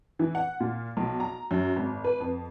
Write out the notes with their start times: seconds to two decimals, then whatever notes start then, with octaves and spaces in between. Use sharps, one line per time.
0.19 E3
0.35 F#5
0.60 A#2
0.97 B1
1.20 A#5
1.51 F#2
1.76 G#1
2.04 B4
2.20 F2